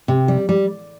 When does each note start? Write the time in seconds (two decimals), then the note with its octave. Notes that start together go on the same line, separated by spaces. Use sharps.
0.08 C3
0.28 G3
0.49 G3